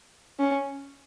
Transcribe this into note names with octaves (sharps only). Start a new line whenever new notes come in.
C#4